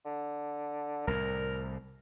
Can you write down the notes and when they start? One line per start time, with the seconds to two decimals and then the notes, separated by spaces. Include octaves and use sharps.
0.05 D3
1.07 C2 A2 A#4